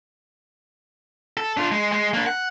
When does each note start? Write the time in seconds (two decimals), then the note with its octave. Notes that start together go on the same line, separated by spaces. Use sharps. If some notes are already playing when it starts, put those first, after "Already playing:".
1.37 A4
1.57 D4 F4
1.71 G#3
1.92 G#3
2.14 A#3 D4
2.26 F#5